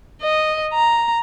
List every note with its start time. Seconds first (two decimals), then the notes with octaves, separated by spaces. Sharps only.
0.22 D#5
0.73 A#5